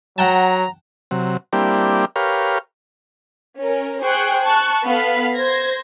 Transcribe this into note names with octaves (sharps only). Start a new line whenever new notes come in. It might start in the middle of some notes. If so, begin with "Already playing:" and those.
F#3 F#5 G5 A5 A#5
C3 F#3
G3 A#3 C4 D4 E4 G4
G4 A#4 B4 C#5 F5
C#4 A#4
G#4 C5 G5 C#6 F#6
A5 C#6 F#6
B3 A4 F5 B5 B6
C5 G#6 A#6